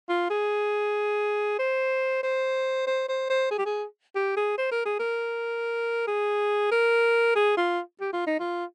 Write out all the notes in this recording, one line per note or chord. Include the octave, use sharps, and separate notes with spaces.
F4
G#4
C5
C5
C5
C5
C5
G#4
G4
G#4
G4
G#4
C5
A#4
G#4
A#4
G#4
A#4
G#4
F4
G4
F4
D#4
F4